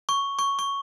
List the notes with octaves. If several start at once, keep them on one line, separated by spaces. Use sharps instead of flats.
C#6
C#6
C#6